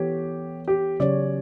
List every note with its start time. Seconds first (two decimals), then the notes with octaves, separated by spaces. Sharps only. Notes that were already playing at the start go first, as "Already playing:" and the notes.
Already playing: E3 B3 E4 G4 A4 C#5
0.68 G4
1.00 C#3 F#3 C#4 G4 C#5 D5